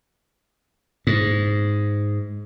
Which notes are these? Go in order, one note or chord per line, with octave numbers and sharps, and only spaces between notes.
G#2